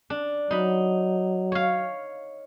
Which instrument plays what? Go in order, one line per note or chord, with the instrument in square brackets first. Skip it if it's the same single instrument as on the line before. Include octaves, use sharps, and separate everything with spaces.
[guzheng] D4
[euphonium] F#3 [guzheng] D#4 B5
[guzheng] C#5 F5